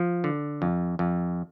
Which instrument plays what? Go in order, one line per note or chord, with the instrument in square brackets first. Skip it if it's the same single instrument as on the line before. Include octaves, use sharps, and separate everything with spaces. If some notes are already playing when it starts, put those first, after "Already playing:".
Already playing: [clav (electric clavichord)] F3
D3
F2
F2